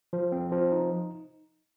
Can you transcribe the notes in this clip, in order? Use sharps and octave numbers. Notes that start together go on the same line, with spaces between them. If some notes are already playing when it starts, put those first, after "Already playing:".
F3
C4
F3
D#4